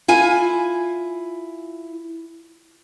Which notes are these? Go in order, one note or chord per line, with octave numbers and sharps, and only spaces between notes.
E4 F4 G#5